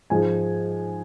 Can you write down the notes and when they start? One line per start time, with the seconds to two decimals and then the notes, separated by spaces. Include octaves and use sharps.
0.10 G#2 F3 G#3 G#5